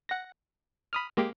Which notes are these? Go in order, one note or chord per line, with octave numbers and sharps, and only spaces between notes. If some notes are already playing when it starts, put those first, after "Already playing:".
F#5 A#6
B5 D#6 F6
G#3 A#3 G4